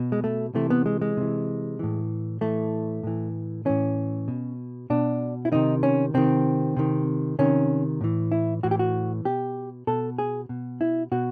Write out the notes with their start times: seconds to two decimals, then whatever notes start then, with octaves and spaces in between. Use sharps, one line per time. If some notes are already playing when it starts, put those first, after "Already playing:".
Already playing: B2
0.12 G#3
0.24 A3
0.55 C3 E3 A3
0.70 B3
0.86 G#3
1.01 G#3
1.17 C3 E3
1.79 A2 E3
2.41 A2 E3 A3
3.03 A2 E3
3.65 A2 E3 C#4
4.28 B2
4.90 B2 D4
5.45 E4
5.52 C3 D#3 D#4
5.83 C#4
6.14 C3 D#3 C4
6.76 C3 D#3
7.39 C3 D#3 C#4
8.01 A2 E3
8.32 E4
8.63 A2 E3 F#4
8.71 G4
8.79 F#4
9.25 B2 G4
9.87 B2 A4
10.18 G#4
10.49 B2
10.81 E4
11.12 B2 F#4